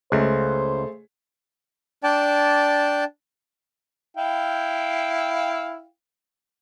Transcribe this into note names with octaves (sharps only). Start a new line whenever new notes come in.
C#2 A3 G#4 C5
D4 D5 G5 A5
E4 F5 G5